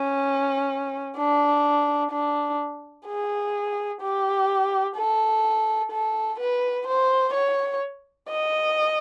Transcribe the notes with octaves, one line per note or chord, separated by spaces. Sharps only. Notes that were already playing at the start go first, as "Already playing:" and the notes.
Already playing: C#4
D4
D4
G#4
G4
A4
A4
B4
C5
C#5
D#5